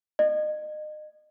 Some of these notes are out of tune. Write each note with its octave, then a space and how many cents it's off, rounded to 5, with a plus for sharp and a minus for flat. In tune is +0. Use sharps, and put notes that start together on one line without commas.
D#5 -35